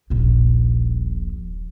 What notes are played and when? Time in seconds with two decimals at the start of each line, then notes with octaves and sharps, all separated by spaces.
0.10 D#1 A#1